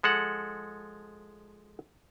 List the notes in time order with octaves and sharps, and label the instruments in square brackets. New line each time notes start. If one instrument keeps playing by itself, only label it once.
[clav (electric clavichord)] F3 G#3 A4 F#5